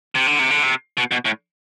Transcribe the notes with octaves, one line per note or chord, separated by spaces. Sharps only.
C3
D3
C3
D3
C3
B2
B2
A2